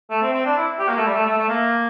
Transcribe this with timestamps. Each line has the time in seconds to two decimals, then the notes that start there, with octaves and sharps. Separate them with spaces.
0.10 A3
0.22 C4
0.33 C4
0.45 D4
0.57 E4
0.79 G4
0.88 A#3
0.97 A3
1.06 G3
1.15 A3
1.26 A3
1.37 A3
1.49 A#3